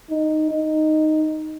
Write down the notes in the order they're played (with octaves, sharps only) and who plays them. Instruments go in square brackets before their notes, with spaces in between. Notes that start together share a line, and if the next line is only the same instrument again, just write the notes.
[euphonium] D#4
D#4